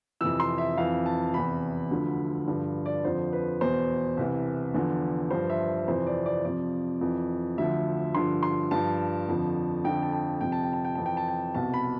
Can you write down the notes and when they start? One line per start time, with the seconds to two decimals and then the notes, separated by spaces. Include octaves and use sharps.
0.21 F2 C3 E3 E6
0.40 C6
0.58 E5
0.77 F2 E3 F5
1.06 A5
1.34 E2 C3 E3 B5
1.91 D2 D3 F3
2.48 G2 D3 F3
2.86 D5
3.04 F2 D3 F3 C5
3.33 B4
3.61 E2 B2 C5
4.17 C2 C3 E3
4.74 E2 D3 F3
5.31 G2 F3 C5
5.50 E5
5.88 F2 C3 E3 C5
6.07 D5
6.26 D5
6.44 F2 C3 F3 D5
7.01 F2 E3
7.58 D2 D3 F3 E5
8.15 G2 D3 F3 C6
8.43 C6
8.71 G2 F3 A5
9.28 F2 D3 F3
9.84 F2 D3 F3 G5
10.03 A5
10.13 G5
10.41 F2 C3 F3 G5
10.52 A5
10.63 G5
10.73 A5
10.85 G5
10.95 F2 E3 A5
11.06 G5
11.17 A5
11.28 G5
11.55 C2 B2 A5
11.74 B5